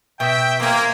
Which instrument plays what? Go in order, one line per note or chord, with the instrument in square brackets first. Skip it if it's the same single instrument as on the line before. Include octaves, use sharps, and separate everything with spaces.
[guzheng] B2 [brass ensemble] E5 G5
[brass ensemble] A#3 [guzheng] C4 G#5